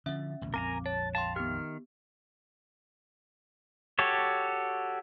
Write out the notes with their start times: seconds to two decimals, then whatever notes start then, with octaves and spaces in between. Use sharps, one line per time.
0.06 D3 F3 C#4 E5
0.41 A1 D2 B2
0.54 A#1 F2 C4 A#4 G#5 A#5 D6
0.86 C#5 A5
1.15 F5 G5 A5 C6
1.36 D#3 B3 G4 F6
3.99 F#4 G4 A4 C#5